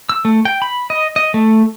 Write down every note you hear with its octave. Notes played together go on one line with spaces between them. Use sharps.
E6
A3
G5
B5
D#5
D#5
A3